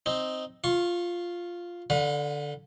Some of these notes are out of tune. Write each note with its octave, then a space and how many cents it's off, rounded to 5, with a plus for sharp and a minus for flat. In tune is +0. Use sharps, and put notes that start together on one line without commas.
C4 +0 D#4 +0
F4 +0 C#6 -35
D3 +0 B4 +0 F5 +45